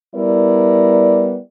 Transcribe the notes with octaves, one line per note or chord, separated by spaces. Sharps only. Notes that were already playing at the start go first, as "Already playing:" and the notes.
G3 B3 E4 A#4 D5